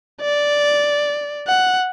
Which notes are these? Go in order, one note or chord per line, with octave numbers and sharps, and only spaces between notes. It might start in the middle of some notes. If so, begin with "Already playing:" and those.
D5
F#5